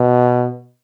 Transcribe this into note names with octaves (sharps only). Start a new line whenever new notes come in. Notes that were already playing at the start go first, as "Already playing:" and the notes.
Already playing: B2